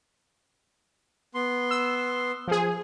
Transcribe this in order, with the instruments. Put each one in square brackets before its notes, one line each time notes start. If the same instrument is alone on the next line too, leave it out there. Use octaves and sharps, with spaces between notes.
[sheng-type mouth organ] B3 C6
[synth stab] E6
F3 G#4